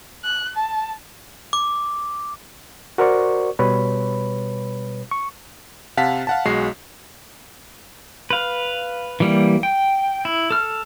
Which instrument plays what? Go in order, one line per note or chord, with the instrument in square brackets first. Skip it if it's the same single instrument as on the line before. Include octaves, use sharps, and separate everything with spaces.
[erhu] F#6
A5
[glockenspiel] D6
[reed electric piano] F#4 A#4 C5 D5 C#6
B2 G3 B4 C#5 B5
C#6
[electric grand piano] C3 F5 F#5 A5 B6
F5 F#5 A5
B1 G#3 F#4 C7
[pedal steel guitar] B4 F5
E3 G3 A#3
G5
E4
A4 F6